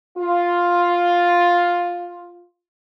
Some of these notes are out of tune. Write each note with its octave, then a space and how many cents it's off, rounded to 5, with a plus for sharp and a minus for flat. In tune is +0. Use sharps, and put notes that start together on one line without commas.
F4 +5